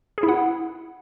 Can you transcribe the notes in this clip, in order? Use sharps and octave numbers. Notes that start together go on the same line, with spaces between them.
G#4
E4
F#5